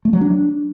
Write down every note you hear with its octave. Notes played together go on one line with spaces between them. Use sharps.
A3
F#3
D4